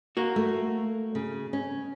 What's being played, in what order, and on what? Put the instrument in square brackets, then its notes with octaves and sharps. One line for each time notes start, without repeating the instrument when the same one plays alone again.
[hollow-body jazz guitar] A#3 F#4
[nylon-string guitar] A3
C#3
C#4